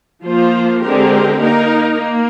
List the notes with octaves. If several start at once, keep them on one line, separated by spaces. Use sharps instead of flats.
F3 A#3 F4 C5
D3 G#3 C4 G4 A#4
A#3 D#4 A#4
A#3